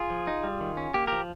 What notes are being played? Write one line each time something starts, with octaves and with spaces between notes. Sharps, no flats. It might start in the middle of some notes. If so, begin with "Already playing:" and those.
Already playing: F4 G#4
F3
D#4
G3
D#3
C#4
A#3 G4
F3 G4 A#4